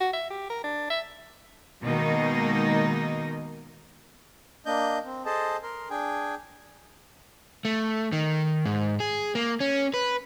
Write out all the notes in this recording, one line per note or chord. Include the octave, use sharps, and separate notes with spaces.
F#4
E5
G4
A#4
D4
E5
B2 D#3 G#3 A#3 D#4
A#3 D4 D#5 G6
C4
G#4 A4 C5 D#5 A5
A#4 C6
D4 G#4 G5 G#5
A3
D#3
G#2
G#4
A#3
C#4
B4